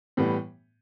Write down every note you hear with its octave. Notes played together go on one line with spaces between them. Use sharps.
A2 E3 G3 B3